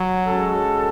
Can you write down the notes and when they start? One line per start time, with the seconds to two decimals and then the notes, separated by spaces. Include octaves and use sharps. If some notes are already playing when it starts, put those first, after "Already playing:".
Already playing: F#3
0.27 G#3 C#4 F#4 A4